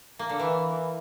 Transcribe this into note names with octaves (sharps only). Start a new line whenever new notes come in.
A#3
D3
E3